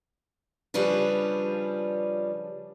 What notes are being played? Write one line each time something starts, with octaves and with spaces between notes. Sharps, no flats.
C#3 F3 G3 C#4 D4 B4